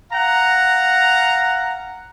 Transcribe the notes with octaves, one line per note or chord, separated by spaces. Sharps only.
F5 F#5 A#5